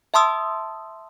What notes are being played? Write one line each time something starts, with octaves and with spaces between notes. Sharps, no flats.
E5 A5 C6 D#6 E6